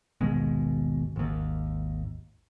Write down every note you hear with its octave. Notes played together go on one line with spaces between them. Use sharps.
G#1 D#2 B2 G#3
G#1 D#2